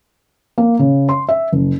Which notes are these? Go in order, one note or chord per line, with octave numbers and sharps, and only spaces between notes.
A#3
C#3
C6
E5
F#1